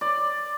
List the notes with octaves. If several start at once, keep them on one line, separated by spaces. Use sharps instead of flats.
D5